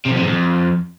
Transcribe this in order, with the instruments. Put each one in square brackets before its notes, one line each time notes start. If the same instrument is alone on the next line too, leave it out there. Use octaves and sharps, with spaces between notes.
[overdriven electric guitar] C3
F2
C3
G#2
F2